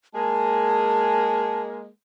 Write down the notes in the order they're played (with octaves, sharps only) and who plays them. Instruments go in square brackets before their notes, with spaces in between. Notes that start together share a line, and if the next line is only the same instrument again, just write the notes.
[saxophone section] G#3 A#3 G#4 [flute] A5